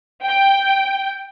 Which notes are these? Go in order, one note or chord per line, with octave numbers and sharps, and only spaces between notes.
G5